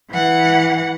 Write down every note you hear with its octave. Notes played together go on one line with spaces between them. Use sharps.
E3 F#5